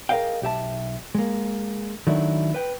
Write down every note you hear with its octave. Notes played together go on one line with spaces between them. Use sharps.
G#4 A#4 C5 D#5 F5 G5
B1 G4 E5 A5
G#3 A#3
D#3 F#3 A3 D4 E4
B4 G5